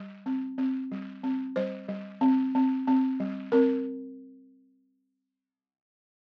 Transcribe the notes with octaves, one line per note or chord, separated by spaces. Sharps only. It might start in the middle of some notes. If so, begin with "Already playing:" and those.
Already playing: G3
C4
C4
G3
C4
G3 C5
G3
C4
C4
C4
G3
C4 A#4